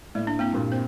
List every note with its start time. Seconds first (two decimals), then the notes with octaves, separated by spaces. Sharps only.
0.15 A2 A3 A#3 D5
0.27 D4
0.39 A#3 C4 E4
0.53 G2 A#2
0.72 C4 C5